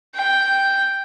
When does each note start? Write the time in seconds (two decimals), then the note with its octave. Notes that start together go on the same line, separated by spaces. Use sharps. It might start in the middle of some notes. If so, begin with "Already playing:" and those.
0.15 G5